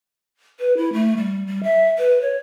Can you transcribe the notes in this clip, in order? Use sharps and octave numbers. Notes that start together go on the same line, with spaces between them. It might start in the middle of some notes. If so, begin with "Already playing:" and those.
B4
E4
A3
G3
G3
E5
B4
C#5